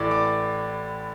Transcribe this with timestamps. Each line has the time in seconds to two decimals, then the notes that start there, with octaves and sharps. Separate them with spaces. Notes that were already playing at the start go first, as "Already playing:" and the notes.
Already playing: A1 A2 E3 D5 D6
0.11 D5 D6